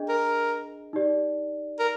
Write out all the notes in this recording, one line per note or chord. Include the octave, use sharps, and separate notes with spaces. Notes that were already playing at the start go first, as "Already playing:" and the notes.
Already playing: D4 G#4 D#5
A#4
D#4 G4 D5
A#4